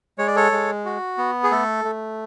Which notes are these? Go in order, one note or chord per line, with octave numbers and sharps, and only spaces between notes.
G#3 C#5
D5
A4 C#5
G#3
F#4
B3
G#4
A3 A4
A3